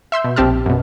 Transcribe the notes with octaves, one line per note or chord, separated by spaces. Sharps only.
E5 C6 E6 G6
B2
A#1 C4 G4 A5 F6
F#2 B2